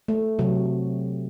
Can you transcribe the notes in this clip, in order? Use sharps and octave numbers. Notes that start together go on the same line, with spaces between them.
A3
C3 F#3